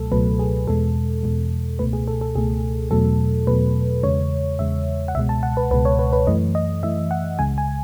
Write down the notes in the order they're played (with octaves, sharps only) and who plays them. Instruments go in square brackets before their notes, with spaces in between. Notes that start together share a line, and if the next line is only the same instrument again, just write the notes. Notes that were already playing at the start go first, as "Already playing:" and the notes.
Already playing: [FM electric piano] C#2 B2 F#3 A3 A4
C#2 B2 F#3 A3 B4
G#4
E2 B2 G#3 A4
E2 B2 G#3
C#2 B2 A3 B4
G#4
A4
A4
C#2 B2 A3 G#4
E2 B2 F#3 A3 A4
E2 B2 F#3 A3 B4
E2 C#3 G#3 C#5
E2 C#3 G#3 E5
F#5
C#2 B2 G#3 E5
A5
F#5
B4
C#2 B2 G#3 B4
C#5
B4
B4
F#2 E3 A3 D#5
D#5
F#2 E3 A3 E5
F#5
C#2 C#3 G#3 G#5
G#5